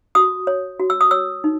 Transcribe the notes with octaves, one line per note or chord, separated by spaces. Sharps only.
F#4 D#6
C#5
F#4
E6
D#6
C#5 E6
D#4